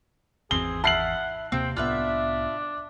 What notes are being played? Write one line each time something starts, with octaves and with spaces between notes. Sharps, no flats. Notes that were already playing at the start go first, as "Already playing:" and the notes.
G#1 E2 C4 G#4 G7
E4 F#5 A5 F6 C7 F#7
D#2 C3 A#3 C4 G5
C2 A2 B3 D4 F4 B4 E5